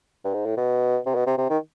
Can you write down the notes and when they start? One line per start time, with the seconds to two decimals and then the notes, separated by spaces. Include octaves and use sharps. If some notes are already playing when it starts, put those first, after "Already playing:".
0.24 G2
0.34 G#2
0.45 A2
0.57 B2
1.06 C3
1.15 B2
1.26 C3
1.38 C3
1.50 D#3